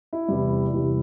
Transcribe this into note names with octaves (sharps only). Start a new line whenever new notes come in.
E4
E2 C3 G3
E2 C3 G3